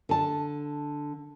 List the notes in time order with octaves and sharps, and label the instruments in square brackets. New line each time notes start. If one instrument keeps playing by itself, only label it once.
[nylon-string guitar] D3 A5